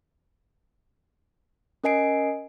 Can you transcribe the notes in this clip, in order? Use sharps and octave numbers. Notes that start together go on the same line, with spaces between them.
C#4 A#4 D#5 G#5 C7 D7